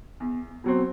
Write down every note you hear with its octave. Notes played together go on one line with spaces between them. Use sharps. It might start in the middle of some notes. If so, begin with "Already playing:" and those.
E2
B2 F#3 C4